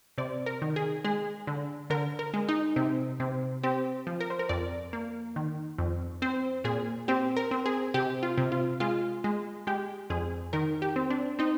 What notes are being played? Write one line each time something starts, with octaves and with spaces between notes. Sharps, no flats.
C3 D5
A#4
D#3
G#4
G#3 G#4
D3
D3 A#4
A#4
G#3
D#4
C3
C3
C4 G4
F3
A#4
C5
A#4
F2 D5
A#3
D#3
F2
C4 C5
A#2 G#4
C4 G4
A#4
C4
G#4
C3 G4
F4
C3
F4
G#3 F4
G#3
G#3 G4
F2 G#4
D#3 A#4
G4
C4
D4
C4 D#4